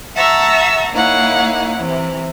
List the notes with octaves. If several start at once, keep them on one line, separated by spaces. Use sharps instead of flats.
E5 F#5 A5 A#5 C#6 E6
A#3 D#4 E4 C#5 F5 F#5
C3 E3